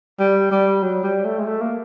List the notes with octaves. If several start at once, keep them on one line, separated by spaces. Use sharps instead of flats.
G3
G3
F#3
G3
A3
G#3
A3
A#3